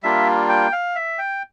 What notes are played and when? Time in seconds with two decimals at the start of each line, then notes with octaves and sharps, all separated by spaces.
0.03 G3 A#3 D4 F4 E5
0.49 G5
0.72 F5
0.96 E5
1.18 G5